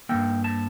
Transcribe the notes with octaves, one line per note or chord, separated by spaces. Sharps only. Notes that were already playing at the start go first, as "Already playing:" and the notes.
G2 F3 A#3 G5
A5